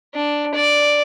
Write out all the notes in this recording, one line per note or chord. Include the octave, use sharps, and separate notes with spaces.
D4
D5